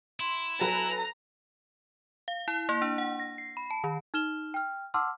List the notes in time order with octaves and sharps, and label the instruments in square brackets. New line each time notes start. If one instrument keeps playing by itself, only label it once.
[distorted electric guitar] E4 [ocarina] C6
[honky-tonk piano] F#3 A4 B4 [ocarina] G#5 [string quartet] A#5
[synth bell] F5
E4
A#3
D4
F#5
A#6
C7
B5
A5
D#3
[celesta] D#4 F6 E7 G7
G5 F6
F#5 A5 C6 D6 E6 F6